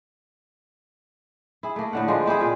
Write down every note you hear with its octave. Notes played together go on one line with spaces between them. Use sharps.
E4 G#4
A3 A#3
A2 D3 F#5
F3 G#3 A#3
C4 E4 G4 G#4
A#2